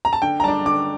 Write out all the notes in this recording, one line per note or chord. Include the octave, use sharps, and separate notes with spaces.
A#5
A5
D3 G5
A#5
G3 D4 A5
D3 D6